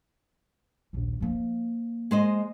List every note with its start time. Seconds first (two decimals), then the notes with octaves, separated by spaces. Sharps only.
0.93 A#1 D#2
1.20 F3 A#3
2.11 G#3 C5 D#5